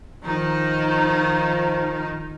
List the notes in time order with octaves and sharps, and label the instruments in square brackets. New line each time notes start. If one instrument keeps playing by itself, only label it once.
[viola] D#3 D#4 [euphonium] F3